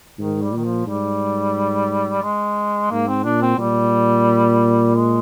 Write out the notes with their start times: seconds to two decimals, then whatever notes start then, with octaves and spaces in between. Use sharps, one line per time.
0.18 G#2 D#3
0.41 G3
0.52 A#2 D#3
0.64 F3
0.87 G#2 G3
2.22 G#3
2.90 G#2 A#3
3.07 C4
3.24 A#2 D4
3.42 C4
3.58 A#2 G3
4.95 G#3